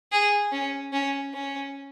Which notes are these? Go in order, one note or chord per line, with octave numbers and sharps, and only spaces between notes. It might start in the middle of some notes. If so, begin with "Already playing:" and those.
G#4
C#4
C#4
C#4